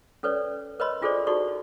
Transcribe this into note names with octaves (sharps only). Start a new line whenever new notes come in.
C#4 A4 B4 C#5 D5
A#4 B4 C#5 D#5 B5 C6
D4 F4 G#4 A4 C5 D5
D#4 F#4 A4 D5 C#6